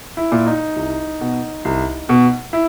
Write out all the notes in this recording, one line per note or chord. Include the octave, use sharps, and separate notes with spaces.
E4
A#2
D#4
C2
B2
C2
B2
E4